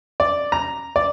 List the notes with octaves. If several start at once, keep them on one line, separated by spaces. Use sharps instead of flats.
D5
A#5
D5